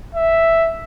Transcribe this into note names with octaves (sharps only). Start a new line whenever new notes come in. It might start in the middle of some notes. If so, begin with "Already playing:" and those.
E5